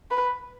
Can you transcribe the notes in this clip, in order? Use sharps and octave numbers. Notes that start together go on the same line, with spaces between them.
B4